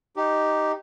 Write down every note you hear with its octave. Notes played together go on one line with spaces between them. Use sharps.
D#4 G4